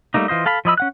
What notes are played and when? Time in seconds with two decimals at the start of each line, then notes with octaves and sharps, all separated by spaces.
0.14 G3 A3 A#3 D#4
0.28 E3 F4 C5 D#5
0.46 A4 F5 A5 B5
0.65 F3 E4 D#5 B5 E6
0.77 C#4 F#5 F#6